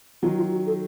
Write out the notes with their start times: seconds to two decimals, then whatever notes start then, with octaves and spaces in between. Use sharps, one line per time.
0.23 D#3 F#3 F4
0.37 F4
0.52 F#4
0.66 A4